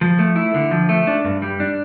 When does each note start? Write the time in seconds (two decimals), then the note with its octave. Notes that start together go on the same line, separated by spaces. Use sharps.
0.01 F3
0.19 A3
0.36 E4
0.54 D3
0.71 F3
0.89 A3
1.07 D4
1.25 G2
1.42 G3
1.60 D4